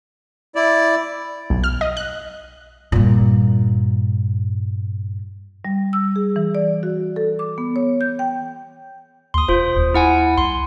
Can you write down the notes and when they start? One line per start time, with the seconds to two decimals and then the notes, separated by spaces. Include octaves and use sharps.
0.56 E4 D5
1.50 B1
1.64 F6
1.81 D#5
1.97 F#6
2.92 G2 A#2
5.65 G3
5.93 E6
6.16 G#4
6.36 E3
6.55 D5
6.83 F#4
7.16 A4
7.39 D6
7.58 B3
7.76 C#5
8.01 G6
8.19 G5
9.34 D#2 C6 D#6
9.48 E1 F4 C5
9.77 D#2
9.94 E4 F#5 G#5
10.38 C2 C6